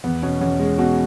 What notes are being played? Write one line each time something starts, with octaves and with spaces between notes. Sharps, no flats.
E2 B3
B2 C#4
E2 C#4
G#3
B2 F#4